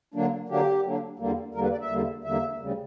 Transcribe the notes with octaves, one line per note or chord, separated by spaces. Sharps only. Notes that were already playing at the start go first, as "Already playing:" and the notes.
D3 F#3 A#3 D4
D3 F#3 A#3 D4 G4
D3 F#3 A#3 D4
E2 D3 G3 A#3
E2 D3 G3 A#3 A#4
B4
D5
E5
E2 D3 G3 A#3
E2 D3 G3 A#3 E5
D2 C#3 G3